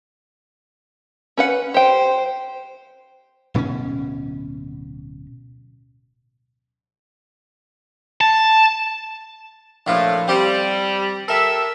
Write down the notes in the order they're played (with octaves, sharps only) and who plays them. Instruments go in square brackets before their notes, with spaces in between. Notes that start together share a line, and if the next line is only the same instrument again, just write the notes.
[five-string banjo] C#4 B4 F#5
[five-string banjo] G4 G5 [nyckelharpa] C5
[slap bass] D1 B2 B3 C#4
[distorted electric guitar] A5
[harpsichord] A#1 F4 [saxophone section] A2
[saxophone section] G3 [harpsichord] C4 G4 D5
[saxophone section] G4 A4 E5 [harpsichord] A#4